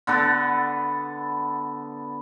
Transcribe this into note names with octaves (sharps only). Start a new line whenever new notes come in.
D3 B3 A4